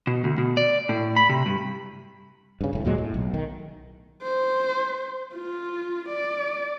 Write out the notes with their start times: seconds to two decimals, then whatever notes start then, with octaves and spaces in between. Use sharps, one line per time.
0.07 B2
0.24 D2
0.38 B2
0.57 D5
0.89 A2
1.16 B5
1.29 C3
1.46 G2
2.61 G2 C#3
2.73 F1 A2
2.85 D#2 A#2 F#3 G#3
2.98 A2
3.14 B1
3.34 D#3
4.23 C5
5.34 F4
6.09 D5